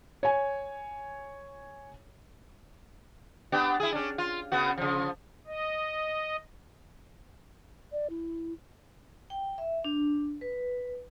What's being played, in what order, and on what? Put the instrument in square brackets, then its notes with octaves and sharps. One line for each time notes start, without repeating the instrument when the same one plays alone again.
[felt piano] C#5 G#5
[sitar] B3 D4 G4
E4 G#4
C#4 D4
F4
C#3 B3 F#4
C#3 F3
[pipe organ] D#5
[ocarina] D5
E4
[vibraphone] G5
E5
D4
B4